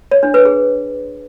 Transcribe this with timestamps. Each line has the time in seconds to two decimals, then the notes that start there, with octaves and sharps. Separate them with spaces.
0.11 C#5
0.23 D4
0.34 B4
0.45 G#4